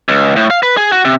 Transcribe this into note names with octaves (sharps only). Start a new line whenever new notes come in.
C#2
A2
F5
B4
G#4
F#4
C3